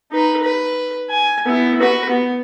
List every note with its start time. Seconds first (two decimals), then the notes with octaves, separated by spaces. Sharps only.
0.11 D#4 B4
0.43 B4
1.10 G#5
1.46 B3 E4
1.80 F#4 B4
2.10 B3